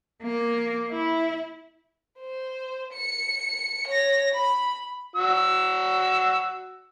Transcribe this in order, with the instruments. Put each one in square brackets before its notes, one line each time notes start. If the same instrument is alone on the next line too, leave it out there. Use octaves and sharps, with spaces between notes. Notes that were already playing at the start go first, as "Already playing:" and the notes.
[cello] A#3
E4
[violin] C5
C#7
C#5 A#6
B5
[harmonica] F#4 E6